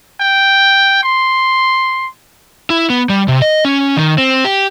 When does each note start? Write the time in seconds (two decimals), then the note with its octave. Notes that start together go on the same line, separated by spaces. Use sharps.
0.21 G5
1.03 C6
2.70 E4
2.90 B3
3.09 G3
3.28 C3
3.42 D#5
3.65 C#4
3.96 D#3
4.18 C4
4.45 G4